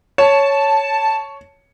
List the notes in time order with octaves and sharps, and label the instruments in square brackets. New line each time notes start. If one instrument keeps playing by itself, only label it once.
[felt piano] C#5 [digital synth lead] A5